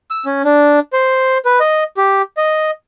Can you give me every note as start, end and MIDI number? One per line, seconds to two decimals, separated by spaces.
0.11 0.25 88
0.26 0.42 61
0.44 0.79 62
0.93 1.38 72
1.45 1.59 71
1.60 1.84 75
1.97 2.22 67
2.37 2.71 75